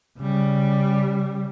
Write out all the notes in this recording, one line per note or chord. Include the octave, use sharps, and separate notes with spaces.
C#3 G3